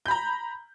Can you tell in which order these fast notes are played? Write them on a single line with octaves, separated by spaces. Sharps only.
G6 B5 A#5